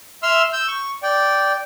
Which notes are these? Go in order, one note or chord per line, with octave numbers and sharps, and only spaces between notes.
E5 C6 E6 F6
E6 G6
C#6
D5 G5